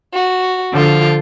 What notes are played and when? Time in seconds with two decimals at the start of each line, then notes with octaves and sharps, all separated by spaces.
0.12 F#4
0.73 D3 F3 F4